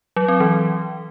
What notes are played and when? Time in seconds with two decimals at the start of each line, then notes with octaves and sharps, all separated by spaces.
0.16 F#3
0.28 C4
0.40 E3